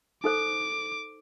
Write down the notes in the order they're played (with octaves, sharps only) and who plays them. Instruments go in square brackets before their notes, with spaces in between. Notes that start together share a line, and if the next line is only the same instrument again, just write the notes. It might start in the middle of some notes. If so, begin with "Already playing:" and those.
[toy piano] D#4 A4 C5 [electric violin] D6